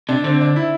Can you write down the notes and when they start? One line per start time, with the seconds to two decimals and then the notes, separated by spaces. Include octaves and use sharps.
0.09 C3 D4
0.24 D3 C4
0.41 D4
0.56 E4